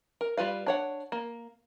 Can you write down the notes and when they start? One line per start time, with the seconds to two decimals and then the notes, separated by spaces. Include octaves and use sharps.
0.21 A#4
0.37 G3 F4 B4 F5
0.66 D4 C#5 F#5
1.12 A#3